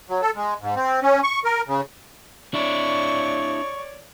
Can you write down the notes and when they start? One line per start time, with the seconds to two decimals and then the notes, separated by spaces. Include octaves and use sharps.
0.09 F#3
0.22 A4
0.36 G#3
0.61 G#2
0.76 C4
1.02 C#4
1.23 C#6
1.45 A#4
1.68 C#3
2.54 D4 E4 C#5 D5 C#6